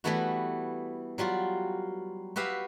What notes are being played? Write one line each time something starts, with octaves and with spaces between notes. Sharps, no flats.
E3 G3 A3 B3 E4 F#4
F#3 G3 F4 F#4
F#4 G4 B4 E5 F5